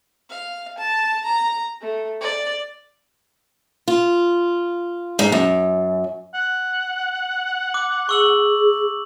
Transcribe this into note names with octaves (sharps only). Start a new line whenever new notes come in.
F5
A5
A#5
A3
D5
F4
G#2
F#2
F#5
D6
G#4 C#6 E6 F#7